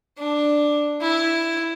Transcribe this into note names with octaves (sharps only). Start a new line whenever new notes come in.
D4
E4